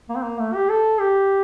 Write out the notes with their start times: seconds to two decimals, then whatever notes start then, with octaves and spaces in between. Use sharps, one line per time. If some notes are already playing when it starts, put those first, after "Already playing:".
0.09 A#3
0.16 C4
0.23 A#3
0.39 A3
0.54 G4
0.69 A4
1.00 G4